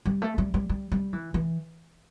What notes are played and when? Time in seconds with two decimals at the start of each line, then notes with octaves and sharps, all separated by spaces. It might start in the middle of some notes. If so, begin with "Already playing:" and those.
0.06 G3
0.22 A3
0.38 G3
0.54 G3
0.69 G3
0.92 G3
1.13 E3
1.34 E3